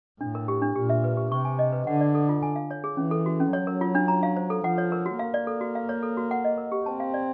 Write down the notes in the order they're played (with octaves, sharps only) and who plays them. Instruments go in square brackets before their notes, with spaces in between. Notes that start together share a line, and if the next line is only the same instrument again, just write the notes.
[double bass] A2 [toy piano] D4
[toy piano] A#4
G4
D4
[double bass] A#2 [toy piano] G4
[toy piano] E5
B4
G4
[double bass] C3 [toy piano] C#6
[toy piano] G#5
D#5
B4
[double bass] D3 [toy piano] F#5
[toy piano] D5
A4
F4
G#5
F5
C#5
G#4
[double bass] E3 [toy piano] C#4
[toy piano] A4
F#4
C#4
[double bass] F#3 [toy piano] C#5
[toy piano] A#4
F4
D4
A#5
F5
C5
A4
[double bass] F3 [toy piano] F#5
[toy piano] C#5
A#4
F#4
[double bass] A#3 [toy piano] F5
[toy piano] D5
A4
F#4
F5
C#5
A4
F#4
F#5
D#5
A#4
G4
[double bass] C4 [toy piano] A5
[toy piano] F5
D5